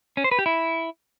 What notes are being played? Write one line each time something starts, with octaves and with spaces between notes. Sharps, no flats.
C#4
C5
B4
G4
E4